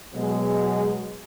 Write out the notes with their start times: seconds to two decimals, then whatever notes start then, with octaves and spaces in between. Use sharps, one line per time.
0.14 B2 F#3 G#3